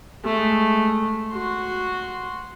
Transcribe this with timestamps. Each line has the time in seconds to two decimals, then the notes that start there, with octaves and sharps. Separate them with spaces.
0.24 G#3 A3
1.32 F#4 C6